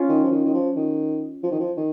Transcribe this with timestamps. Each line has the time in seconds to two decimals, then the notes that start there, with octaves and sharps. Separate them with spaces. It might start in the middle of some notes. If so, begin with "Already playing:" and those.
Already playing: C#4 F4
0.09 D#3
0.24 F3
0.31 D#3
0.45 D#3
0.54 F3
0.76 D#3
1.43 F3
1.51 D#3
1.59 F3
1.77 D#3